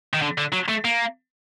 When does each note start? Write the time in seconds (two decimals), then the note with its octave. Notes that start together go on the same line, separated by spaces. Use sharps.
0.13 D#3
0.22 D3
0.38 D3
0.52 F#3
0.69 A3
0.84 A#3